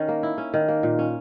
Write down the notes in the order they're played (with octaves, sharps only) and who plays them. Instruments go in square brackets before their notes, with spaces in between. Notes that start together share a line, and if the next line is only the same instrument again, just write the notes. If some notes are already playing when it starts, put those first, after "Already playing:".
Already playing: [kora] D#3 C#4
A#3
E4
C#4
D#3
A#3
A#2
C#4